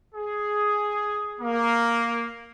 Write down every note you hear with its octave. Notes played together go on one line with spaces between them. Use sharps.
G#4
A#3